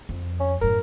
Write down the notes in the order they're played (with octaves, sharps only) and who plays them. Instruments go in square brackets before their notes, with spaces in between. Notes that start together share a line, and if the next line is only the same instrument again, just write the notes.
[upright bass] F2
[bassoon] C#4
[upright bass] F#2 A2 [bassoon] A#4